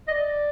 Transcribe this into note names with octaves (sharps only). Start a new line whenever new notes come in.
D#5
D5